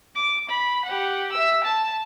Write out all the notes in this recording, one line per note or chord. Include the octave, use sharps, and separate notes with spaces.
D6
B5
G4 F#5
E5 E6
A5